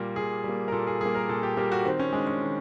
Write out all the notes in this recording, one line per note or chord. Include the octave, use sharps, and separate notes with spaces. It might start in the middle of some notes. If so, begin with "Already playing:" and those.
Already playing: A#2 G3 A#3
A#2 G#4
G3 A#3
A#4
A#2 A4
G#4
G3 A#3 G#4
A#4
A#2 A4
G4
G3 A#3 G4
F#4
D#3 C4
C#4
G#3 D4
C#4
D#3